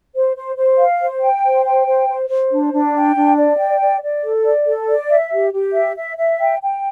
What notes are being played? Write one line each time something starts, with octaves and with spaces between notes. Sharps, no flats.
C5
C5
C5
F5
C5
G5
C5
G5
C5
C5
C5
D4
D4
G5
D4
D5
G5
D5
D5
A4
D5
A4
D5
E5
G4
G4
E5
E5
E5
G5
G5